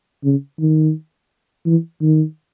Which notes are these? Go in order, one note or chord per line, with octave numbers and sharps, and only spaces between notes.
C#3
D#3
E3
D#3